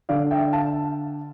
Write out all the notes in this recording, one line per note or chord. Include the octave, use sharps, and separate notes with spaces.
D3 D5 F5
E5 G5
F5 A5